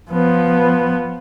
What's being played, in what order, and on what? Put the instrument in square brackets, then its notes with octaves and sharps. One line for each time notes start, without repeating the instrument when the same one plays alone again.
[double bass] F3 B3